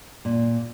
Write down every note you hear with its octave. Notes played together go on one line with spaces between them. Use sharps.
A#2